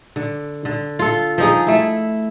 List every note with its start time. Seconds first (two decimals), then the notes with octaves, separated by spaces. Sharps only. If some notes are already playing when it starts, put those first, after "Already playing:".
0.16 D3
0.65 D3
0.99 F4 A4
1.38 F3 D#4 G#4
1.67 A3 E4